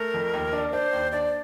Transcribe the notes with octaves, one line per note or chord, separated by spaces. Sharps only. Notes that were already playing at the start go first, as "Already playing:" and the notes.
Already playing: A3 A#4
F2
D#2
D4
D4 C5
D#2
D4 D5